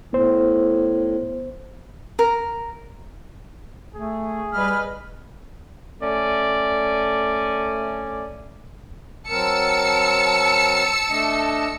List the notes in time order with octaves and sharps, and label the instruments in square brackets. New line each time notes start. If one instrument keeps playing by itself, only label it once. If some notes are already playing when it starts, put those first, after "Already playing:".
[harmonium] A2 [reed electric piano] B3 C5
[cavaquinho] A#4
[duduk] A3 [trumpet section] G#4
[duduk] G3 [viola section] B4 D#5 B5 [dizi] F6
[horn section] A3 C#4 D5
[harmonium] F#3 C4 A#4 [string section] A5 E6 C#7
[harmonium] A3 D4 D#5